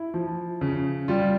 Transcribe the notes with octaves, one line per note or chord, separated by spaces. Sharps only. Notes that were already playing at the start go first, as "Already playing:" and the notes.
Already playing: E4
F3
C#3
G3 F4